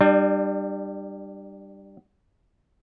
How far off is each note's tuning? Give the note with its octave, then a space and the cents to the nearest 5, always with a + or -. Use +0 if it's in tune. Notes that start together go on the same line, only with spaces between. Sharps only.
G3 +0 D4 +40